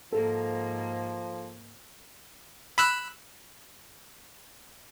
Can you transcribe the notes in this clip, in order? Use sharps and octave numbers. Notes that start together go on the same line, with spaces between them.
G#2 F3 A#3 A4
B5 E6 F#6